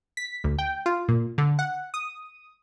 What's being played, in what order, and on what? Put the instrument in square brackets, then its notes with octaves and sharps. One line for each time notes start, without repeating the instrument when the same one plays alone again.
[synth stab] B6
D2
G5
F4
A#2
D3
F#5
D#6